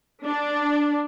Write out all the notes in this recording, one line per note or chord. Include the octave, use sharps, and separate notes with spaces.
D4